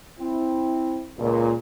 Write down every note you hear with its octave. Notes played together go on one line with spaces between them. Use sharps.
C4 E4
C#2 A#2